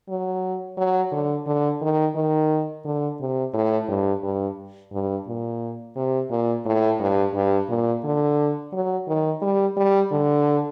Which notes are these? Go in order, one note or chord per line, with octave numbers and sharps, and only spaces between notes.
F#3
F#3
D3
D3
D#3
D#3
D3
C3
A2
G2
G2
G2
A#2
C3
A#2
A2
G2
G2
A#2
D3
F#3
D#3
G3
G3
D3